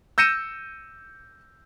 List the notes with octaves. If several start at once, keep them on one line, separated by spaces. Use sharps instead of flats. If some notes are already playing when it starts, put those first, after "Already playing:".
E6 G6 A#6 C#7 D#7 E7